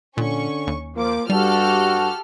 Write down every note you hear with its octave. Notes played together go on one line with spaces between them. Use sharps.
A#2 D3 C#4 C#6
D#2
F3 A#3 D6
G2 G3 F#4 G4 A4 F6